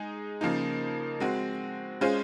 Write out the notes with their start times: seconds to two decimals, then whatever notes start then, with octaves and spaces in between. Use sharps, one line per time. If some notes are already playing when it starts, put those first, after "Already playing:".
Already playing: G#3 D#4 G#4
0.41 C#3 F3 A#3 D#4
1.20 G#3 C4 F#4
2.01 G#3 C#4 F4 G#4 C5